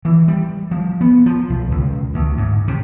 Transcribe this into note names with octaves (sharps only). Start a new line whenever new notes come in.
E3
G3
F3
B3
F3
B1
C#2
D2
G#2
C3